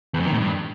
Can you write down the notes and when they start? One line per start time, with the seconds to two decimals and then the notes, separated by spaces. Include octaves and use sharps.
0.14 E2
0.20 F2
0.26 D#3
0.32 A2
0.38 G2